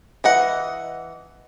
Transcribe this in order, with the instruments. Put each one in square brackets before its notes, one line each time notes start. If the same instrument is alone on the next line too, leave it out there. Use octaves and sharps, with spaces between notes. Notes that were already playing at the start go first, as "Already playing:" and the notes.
[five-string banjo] E3 D#5 F#5